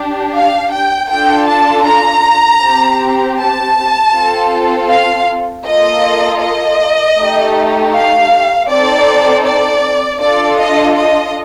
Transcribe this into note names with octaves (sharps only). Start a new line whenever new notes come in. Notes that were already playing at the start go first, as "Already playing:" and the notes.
Already playing: D4 G4
F5
G5
D4 F4 A4 G5
A5
A#5
C4 G4
A5
C4 F4 A4
F5
A#3 F4 A4 D#5
D#5
A3 D#4 G4
F5
C4 D#4 A4 D5
D5
D4 F4 A4 D5
D#5
D#5